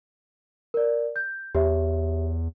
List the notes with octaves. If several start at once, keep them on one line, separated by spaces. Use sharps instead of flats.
A#4 D5
G6
E2 G4 C#5 E5